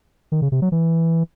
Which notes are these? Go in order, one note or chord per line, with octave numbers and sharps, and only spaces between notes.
D#3
C#3
C3
F#3
E3